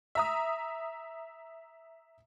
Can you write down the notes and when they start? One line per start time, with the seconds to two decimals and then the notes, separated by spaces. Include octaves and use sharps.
0.15 E5 A#5 D#6